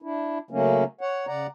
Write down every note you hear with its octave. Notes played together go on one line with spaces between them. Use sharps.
D4 E4
C#3 F#3 A3 A#3 C#4
C#5 F#5
C#3 D5 F#5 A#5